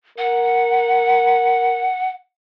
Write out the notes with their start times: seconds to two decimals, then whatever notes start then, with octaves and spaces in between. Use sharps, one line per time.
0.18 A#4 F#5